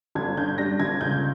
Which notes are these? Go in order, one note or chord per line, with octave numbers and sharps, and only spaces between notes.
G1 G#6
G2 G6
G3 A#6
G1 G#6
C#2 G6